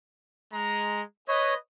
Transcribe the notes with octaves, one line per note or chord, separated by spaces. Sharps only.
G#3 A#5
B4 C#5 D#5